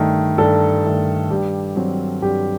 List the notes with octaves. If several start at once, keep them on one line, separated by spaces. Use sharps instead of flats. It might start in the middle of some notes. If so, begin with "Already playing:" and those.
Already playing: G2 D#3 A3
G2 A4
D#3 A3
G2 G4
F#3 C4
G2 G4